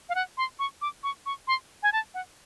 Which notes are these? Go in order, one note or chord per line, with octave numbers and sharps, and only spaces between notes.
F5
F#5
C6
C#6
D6
C#6
C#6
C6
G#5
A5
F#5